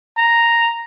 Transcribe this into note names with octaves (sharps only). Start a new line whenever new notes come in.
A#5